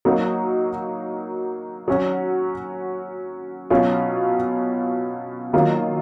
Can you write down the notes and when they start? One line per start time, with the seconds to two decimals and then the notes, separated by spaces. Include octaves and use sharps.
0.05 F#3 A#3 D#4 F#4
1.88 F#3 C#4 F#4
3.70 B2 F#3 C#4 F4
5.53 D#3 F#3 A#3 F4